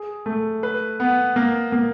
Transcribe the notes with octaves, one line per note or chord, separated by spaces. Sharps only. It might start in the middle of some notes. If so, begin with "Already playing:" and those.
Already playing: G#4
A3
B4
B3
A#3
A#3